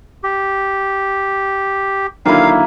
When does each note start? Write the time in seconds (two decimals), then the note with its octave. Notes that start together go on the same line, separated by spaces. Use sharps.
0.24 G4
2.25 D3 D#3 F#3 A#3 E4 F5